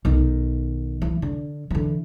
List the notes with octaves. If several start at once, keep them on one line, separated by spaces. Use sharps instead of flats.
B1 D#3
E3
D3
D3 E3